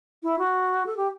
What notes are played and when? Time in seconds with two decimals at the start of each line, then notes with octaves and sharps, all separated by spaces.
0.23 E4
0.39 F#4
0.86 A4
0.97 G4